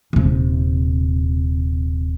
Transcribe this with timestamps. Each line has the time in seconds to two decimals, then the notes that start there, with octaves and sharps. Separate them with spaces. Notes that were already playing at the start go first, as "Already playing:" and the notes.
0.13 D#1 C3